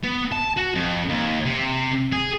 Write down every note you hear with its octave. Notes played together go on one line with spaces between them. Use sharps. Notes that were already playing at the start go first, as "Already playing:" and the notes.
B3
A5
F#4
F2
D#2
C3
G#4